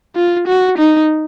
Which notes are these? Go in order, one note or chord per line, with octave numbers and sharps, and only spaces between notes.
F4
F#4
D#4